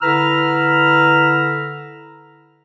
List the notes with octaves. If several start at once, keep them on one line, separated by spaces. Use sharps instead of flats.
D3 E4 B4 A#5 E6 F6